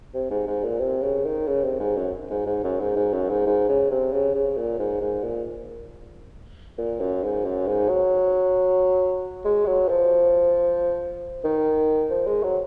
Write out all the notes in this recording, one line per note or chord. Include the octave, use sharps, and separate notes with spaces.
C3
G#2
G#2
A#2
C3
C#3
D#3
C#3
C3
G#2
F#2
G#2
G#2
F#2
G#2
G#2
F#2
G#2
G#2
C#3
C3
C#3
C#3
A#2
G#2
G#2
A#2
A#2
F#2
G#2
F#2
G#2
F#3
G#3
F#3
F3
D#3
F3
G#3
F#3